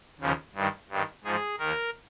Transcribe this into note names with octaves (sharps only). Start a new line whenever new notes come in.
D#2 C#3 F3
G2 D#3
G2 D#3
G#2 F3 G#4
D#2 D#3 A#4